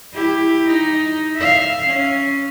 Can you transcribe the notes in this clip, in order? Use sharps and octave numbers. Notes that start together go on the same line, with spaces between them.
E4 G4
D#4
E5 F5
C#4